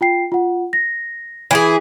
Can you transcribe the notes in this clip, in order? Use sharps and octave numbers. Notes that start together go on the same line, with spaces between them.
F4 G5 C7
F4 F#5
A#6
E3 E4 G#4 G#6